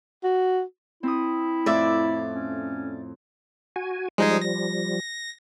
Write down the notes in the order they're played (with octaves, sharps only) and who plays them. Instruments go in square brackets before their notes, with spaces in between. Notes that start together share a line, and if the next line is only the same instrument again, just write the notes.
[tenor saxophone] F#4
[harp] C4 D#6 [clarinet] E4
[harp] F2 A2 D6 [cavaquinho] D5 E5
[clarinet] C#4
[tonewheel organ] F#4 G#5
[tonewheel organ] F3 G3 [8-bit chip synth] G#3 D#4 G#4
[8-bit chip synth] A#6